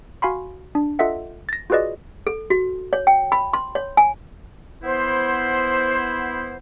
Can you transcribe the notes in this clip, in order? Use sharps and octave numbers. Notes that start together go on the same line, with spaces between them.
F#4 F5 G#5 B5 C6
D4
F4 A4 D#5 E5 F#5
A6 A#6
F4 F#4 G#4 B4 D5 D#5
A4
F#4
C#5
G5
B5
C6
C#5
G#5
B3 E4 C5